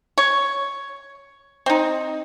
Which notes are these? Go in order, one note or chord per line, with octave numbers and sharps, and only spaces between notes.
C#5
C4 D#4